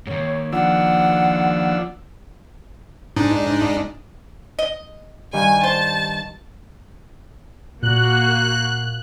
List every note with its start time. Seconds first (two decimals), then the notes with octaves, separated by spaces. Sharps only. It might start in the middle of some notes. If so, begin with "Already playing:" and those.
0.07 D#2 G#2 C#5
0.53 F3 D4 F#5 E6
3.16 G#2 D4 D#4
4.59 D#5
5.33 G2 D#3 G5 G#5
5.63 C5 A5
7.83 A#2 A#3 F#4 F#6